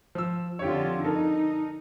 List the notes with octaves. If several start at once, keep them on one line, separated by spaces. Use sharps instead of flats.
F3 E6
F2 D3 F4 G4 C#5
D#4 A4 A#4